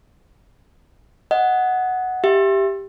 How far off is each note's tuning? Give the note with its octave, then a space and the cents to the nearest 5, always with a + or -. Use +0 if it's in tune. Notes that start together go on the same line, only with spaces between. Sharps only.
D#5 +10 F#5 +0
G4 +0 E5 +20